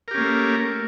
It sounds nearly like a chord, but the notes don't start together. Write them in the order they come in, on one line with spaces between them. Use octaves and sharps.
A#4 G4 C#4 A#3 A3